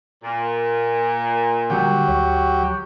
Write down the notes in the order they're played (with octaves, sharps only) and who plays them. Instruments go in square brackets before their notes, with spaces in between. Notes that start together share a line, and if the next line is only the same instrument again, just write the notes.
[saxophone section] A#2
[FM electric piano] D3 G3 [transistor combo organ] F#3 G4
[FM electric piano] D2 C#5 C#6